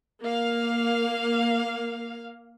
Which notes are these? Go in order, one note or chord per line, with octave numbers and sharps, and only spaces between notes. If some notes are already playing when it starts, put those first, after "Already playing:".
A#3 F5